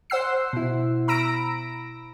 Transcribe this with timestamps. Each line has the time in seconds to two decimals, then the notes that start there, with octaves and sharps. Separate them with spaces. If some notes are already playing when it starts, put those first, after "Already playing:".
0.10 C5 F#5 E6 C7
0.53 B2 E4
1.08 A#5 B5 E6 A#6 D7